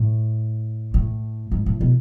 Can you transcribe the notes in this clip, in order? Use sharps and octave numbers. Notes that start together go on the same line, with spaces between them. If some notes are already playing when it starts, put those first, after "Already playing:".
Already playing: A2
A2
G#2
A2
B2